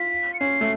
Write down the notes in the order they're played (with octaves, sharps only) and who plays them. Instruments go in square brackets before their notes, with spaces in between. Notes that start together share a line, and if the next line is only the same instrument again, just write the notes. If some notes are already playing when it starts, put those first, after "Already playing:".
Already playing: [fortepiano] F4 [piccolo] B6
[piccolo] C#7
[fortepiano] C#4 [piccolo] C7
[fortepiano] A3